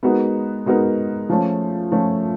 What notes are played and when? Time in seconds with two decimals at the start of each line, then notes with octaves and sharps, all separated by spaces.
0.03 G#3 B3 D#4 F#4 A#4
0.66 G#3 B3 D#4 F#4 A#4
1.29 F3 A3 C#4
1.92 F3 A3 C#4